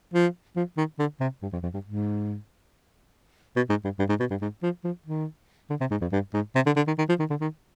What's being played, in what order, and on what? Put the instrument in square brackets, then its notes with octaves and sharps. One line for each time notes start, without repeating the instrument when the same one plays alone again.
[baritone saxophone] F3
F3
D#3
D3
C3
G2
F2
F2
G2
G#2
B2
G#2
G2
G2
G#2
B2
G2
G#2
F3
F3
D#3
D3
C3
G#2
F2
G2
G#2
C3
D3
D3
D#3
D#3
F3
D#3
D3
D#3